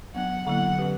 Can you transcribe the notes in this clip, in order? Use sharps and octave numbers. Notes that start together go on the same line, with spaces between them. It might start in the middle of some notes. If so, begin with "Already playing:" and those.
F#3 B3 D4 F#5
D3 F#3 A#3 E4 F#5
F#3 C#4 G4 B4